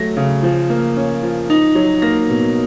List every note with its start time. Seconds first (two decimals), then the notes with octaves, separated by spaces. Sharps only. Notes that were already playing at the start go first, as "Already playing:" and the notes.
Already playing: F#3 A3 A#6
0.17 C#3
0.43 F3
0.70 A#3
0.97 C#4
1.23 F3
1.50 D#4
1.75 F#3
2.02 A#3 A#6
2.29 B2